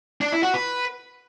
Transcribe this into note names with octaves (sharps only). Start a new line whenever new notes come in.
D4
E4
F#4
B4